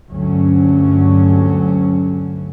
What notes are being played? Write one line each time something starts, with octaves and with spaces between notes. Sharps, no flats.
D2 G2 F#3 C#4